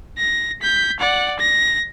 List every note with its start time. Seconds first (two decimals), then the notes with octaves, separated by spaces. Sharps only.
0.17 A#6
0.62 G6 B6
1.00 D5 F#5
1.39 A#6